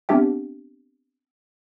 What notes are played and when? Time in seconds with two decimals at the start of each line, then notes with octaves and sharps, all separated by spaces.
0.09 B3 C4 D4 G4 E5 G5